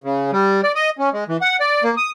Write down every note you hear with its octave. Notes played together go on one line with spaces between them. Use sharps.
C#3
G3
D5
D#5
C#4
G#3
E3
F#5
D5
A#3
D#6